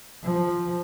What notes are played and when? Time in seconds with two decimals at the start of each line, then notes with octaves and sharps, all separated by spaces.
0.23 F3